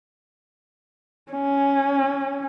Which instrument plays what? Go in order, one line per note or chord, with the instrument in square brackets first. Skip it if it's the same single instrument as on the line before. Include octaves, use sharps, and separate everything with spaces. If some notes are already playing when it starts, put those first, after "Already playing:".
[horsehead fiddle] C#4